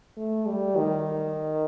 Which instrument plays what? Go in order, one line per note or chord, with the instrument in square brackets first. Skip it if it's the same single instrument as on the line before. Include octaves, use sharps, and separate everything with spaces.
[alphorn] A3
G3
D#3